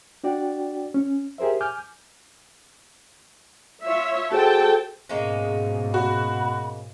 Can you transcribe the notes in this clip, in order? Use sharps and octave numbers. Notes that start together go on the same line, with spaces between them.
D4 F#4 D5 G5
C#4
G4 G#4 A#4 C5 E5
G#5 D6 F6 G6
F4 C#5 E5
F#4 G#4 A4 C5 G5 A5
G#2 B2 G#3 A#3 C#4
F#4 B5